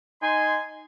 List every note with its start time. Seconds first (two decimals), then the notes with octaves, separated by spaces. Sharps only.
0.21 D#4 G#5 C6